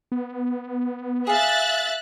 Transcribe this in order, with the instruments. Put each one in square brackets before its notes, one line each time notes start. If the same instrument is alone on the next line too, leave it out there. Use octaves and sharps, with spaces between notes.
[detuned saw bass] B3
[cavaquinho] G#4 F5 [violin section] E5 F#6 A6